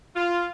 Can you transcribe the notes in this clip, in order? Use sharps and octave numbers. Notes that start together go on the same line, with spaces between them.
F4